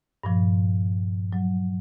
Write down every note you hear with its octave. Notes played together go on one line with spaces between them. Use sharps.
G2 A#2 F3
F#3